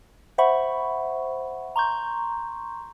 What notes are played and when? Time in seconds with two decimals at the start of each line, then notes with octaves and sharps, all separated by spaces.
0.38 C5 E5 F#5 B5 C#6
1.76 A#5 C6 C#6 G6